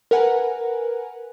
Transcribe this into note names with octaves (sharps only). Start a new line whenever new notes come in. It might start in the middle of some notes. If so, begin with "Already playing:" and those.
A#4 B4 F#5 G#5